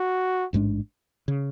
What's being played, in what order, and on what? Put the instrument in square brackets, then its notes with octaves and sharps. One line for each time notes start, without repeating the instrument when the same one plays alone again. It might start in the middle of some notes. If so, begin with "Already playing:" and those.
Already playing: [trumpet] F#4
[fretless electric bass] A1 G#2 G#3 D4
C#3